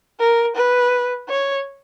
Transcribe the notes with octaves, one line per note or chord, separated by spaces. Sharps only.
A#4
B4
C#5